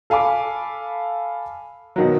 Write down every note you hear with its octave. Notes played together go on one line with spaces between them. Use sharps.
A4 F5 G#5 B5 D6
B2 D#3 F#3